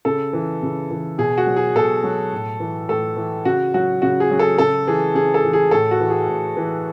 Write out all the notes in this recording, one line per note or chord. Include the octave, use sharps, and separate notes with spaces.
C#3 A4
E3
C#3
E3
B2 G#4
F#4
F#3
G#4
B2 A4
F#3
A2
E3
A2 A4
E3
C#3 F#4
F#3 F#4
C#3 F#4
G#4
F#3
A4
C#3 A4
E3 G#4
C#3 G#4
A4
E3
G#4
A2 A4
F#4
E3
G#4
A2
E3